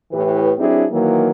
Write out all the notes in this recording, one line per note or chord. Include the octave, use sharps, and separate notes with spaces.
A2 E3 G4 B4
F#3 C4 D4 E4 G4 G#4
D#3 E3 F#3 A#3